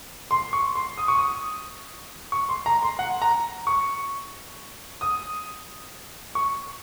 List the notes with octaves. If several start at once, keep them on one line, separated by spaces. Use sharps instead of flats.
C6
C#6
C6
D#6
C#6
D#6
C#6
C6
A#5
C6
F#5
A#5
C#6
D#6
C#6